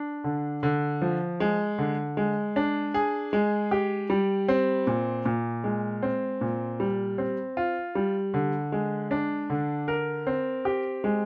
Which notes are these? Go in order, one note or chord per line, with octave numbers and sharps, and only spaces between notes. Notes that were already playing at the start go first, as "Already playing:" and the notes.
Already playing: D4
D3
D3
F3
G#3
D3
G#3
D4
G#4
G#3
G4
G3
C4
A#2
A#2
G#3
C4
A#2
G3
C4
F4
G3
D3
G#3
D4
D3
A#4
C4
G4
G#3